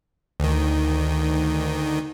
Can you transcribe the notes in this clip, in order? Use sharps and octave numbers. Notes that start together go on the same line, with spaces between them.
D2 D#3